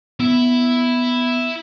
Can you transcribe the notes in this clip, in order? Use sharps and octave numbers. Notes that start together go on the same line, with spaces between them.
B3 E4